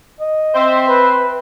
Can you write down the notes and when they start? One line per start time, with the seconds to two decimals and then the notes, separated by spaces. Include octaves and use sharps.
0.21 D#5
0.54 C4 C5 E5
0.88 B4